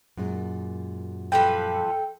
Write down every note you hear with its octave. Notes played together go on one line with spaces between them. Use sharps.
F#2 A#2 G#3
F3 G3 A4 B4 G5